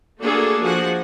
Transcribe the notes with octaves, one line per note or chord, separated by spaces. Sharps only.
A3 A#3 D4 F#4 G#4 A4
F3 F#4 G#4 F#5